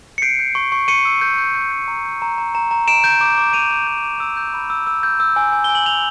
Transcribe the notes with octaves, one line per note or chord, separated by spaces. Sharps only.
C#7
G6 C7 D7
G6
C#6
C#6
C#6 C#7 D#7
E6
G6
G6
G6
G6
A#5
G6
A#5
A#5
A#5
A#5
A#5 D7 E7
G6
D6
D6
A#5 D#7 F7
A#5
G6
D6
E6
G6
B5
E6
E6
G6
E6
G#5
G#5
G#5 G7
F#7
G#5 F7 G7